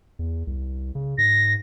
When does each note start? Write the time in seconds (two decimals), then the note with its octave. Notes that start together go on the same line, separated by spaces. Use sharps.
0.19 E2
0.47 C2
0.95 C#3
1.18 G#2 A#6